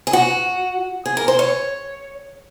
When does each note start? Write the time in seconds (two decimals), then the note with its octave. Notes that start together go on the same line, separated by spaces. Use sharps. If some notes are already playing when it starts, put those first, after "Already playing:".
0.07 G#4
0.13 F#4
1.06 G#4
1.17 A#4
1.28 C5
1.39 C#5